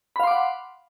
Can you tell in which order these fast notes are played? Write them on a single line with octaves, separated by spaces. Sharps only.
B5 F5 C6 D6 F#5